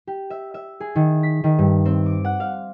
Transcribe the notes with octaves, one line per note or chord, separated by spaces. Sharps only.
G4
E5
E5
G#4
D#3
B6
D#3
G2
C4
D6
F#5
F5